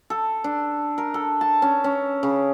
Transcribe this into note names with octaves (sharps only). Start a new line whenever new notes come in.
A4
D4
A#4
A4
A5
C#4
C#4
C#3